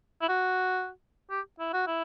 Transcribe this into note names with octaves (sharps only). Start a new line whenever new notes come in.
E4
F#4
G4
E4
F#4
E4